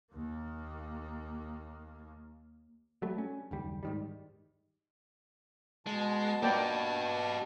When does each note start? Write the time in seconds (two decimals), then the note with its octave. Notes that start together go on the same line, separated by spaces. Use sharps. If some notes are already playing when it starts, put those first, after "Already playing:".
0.12 D#2 A#3
3.02 F#3 G3 A3
3.18 C#4
3.51 F#1 D#2 G3
3.83 G#2 D#3 G3
5.87 B2 G#3 A5
6.43 A#3 G4 B4 D5 G5